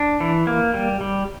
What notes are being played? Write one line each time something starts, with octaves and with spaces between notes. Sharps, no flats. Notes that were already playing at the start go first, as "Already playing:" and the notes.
Already playing: D4
E3
A#3
G3
G3